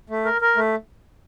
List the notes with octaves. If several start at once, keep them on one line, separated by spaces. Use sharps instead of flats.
A3
A#4
A#4
A3